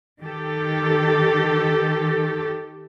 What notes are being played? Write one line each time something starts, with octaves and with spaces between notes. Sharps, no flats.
D#3 G4 A4